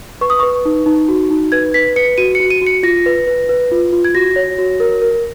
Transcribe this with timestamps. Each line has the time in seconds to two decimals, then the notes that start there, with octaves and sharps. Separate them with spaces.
0.21 B4 C#6
0.30 D#6
0.40 B4 C#6
0.65 D#4
0.86 D#4
1.09 F#4
1.31 D#4
1.52 B4 G#6
1.74 B4 B6
1.96 B4 C#7
2.18 F#4 D#7
2.35 F#4 C#7
2.50 D#7
2.61 F#4
2.67 C#7
2.83 F4 A#6
3.06 B4
3.27 B4
3.49 B4
3.71 F4
3.92 F4
4.05 G#6
4.15 F#4 A#6
4.36 C#5
4.58 F#4
4.80 A#4
5.02 A#4